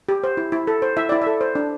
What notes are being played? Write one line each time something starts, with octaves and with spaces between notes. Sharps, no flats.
G4
C5
E4
E4
A4
C5
E4 E5
E4 D5
E5
A4
C5
D4